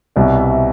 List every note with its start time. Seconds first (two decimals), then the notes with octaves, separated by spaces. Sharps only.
0.16 C2 B2 G3 D5
0.39 E5